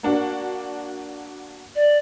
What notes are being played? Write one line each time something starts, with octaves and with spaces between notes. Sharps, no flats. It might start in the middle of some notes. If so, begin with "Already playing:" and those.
A#3 D4 F#4
D5